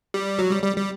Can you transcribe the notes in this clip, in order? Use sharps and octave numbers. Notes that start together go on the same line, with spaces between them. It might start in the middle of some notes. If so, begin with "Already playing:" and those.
G3
F#3
G3
G3
G3